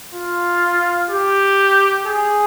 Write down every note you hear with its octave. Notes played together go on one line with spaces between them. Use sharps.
F4
G4
G#4